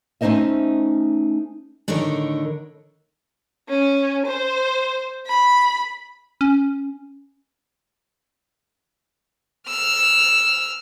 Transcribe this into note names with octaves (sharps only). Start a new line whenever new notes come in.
A3 C#4 D#4 C5 D#5 E5
A2 D3 D#3 D#4 A#4 C#5
C#4
C5
B5
C#4
E6 F6